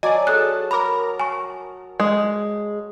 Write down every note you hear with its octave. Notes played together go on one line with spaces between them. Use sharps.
F#3 D5 D#5 G#5 A5 D6
G#4 A4 A5 D#6 F#6
A#4 A#5 B5 D6
G#5 C#6
G#3